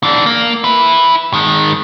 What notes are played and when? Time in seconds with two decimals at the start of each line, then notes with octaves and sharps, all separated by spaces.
0.03 E3 D4
0.26 A#3
0.64 E4 B4
1.34 D#3 G#3